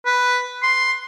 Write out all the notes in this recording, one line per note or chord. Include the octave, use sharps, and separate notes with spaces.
B4
C6